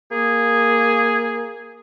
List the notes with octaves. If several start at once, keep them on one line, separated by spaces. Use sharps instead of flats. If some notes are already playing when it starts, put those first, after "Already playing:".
A#3 G#4